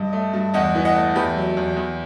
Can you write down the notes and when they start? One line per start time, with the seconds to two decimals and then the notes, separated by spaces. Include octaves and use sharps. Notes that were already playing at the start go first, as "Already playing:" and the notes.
Already playing: G2 D#5
0.13 A3
0.33 G2
0.54 E2 D#5 F#5
0.75 E3
0.85 D#5 F#5
0.95 A3
1.16 E2 G4 B4
1.36 F#3
1.57 E2
1.77 E2